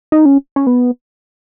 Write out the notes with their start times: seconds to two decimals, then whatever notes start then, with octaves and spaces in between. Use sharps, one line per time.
0.12 D#4
0.25 C#4
0.56 C#4
0.67 B3